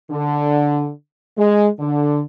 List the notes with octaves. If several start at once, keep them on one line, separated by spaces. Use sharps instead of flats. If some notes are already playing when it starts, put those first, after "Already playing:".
D3
G#3
D3